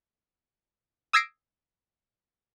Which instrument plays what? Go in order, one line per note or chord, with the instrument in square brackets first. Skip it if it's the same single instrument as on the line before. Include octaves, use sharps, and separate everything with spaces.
[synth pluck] D#6 E6 G#6 A#6 C7 D7